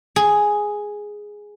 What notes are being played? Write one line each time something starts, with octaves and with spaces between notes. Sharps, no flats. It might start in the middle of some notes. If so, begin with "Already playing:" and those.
G#4